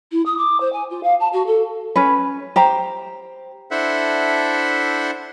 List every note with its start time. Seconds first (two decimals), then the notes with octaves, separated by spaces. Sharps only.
0.12 E4
0.26 D#6
0.38 D6
0.60 C5
0.73 G#5
0.91 F4
1.03 F5
1.20 A5
1.33 F#4
1.47 A4
1.96 C#4 B4
2.56 G4 C5 A#5
3.71 D4 E4 A4 C5 E5 F#5